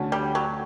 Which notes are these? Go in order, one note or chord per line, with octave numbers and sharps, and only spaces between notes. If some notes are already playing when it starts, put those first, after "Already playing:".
Already playing: D2 D3 A3 C#4 F#4
G3
F#3